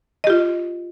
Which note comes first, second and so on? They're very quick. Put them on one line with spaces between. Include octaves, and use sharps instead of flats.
D#5 G4 F4